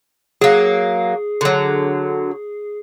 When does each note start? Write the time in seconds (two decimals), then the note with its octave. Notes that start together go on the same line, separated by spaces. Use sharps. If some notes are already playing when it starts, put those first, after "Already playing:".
0.41 F#3 A#3 G#4
1.41 D3 F#3